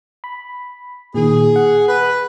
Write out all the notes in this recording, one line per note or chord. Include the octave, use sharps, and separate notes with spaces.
B5
A#2 D#3 G#4
F#5
B4